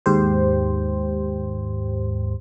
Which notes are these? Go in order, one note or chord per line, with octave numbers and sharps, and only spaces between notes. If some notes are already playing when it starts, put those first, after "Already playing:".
D#2 G#2 G4 C5